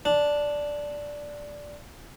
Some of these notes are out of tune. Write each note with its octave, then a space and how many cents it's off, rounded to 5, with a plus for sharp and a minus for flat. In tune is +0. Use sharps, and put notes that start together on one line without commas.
D4 -5